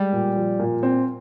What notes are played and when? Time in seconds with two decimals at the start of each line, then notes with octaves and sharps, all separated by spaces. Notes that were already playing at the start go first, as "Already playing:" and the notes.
Already playing: G3 G#3
0.12 A#2
0.36 F3
0.59 A#2
0.83 C4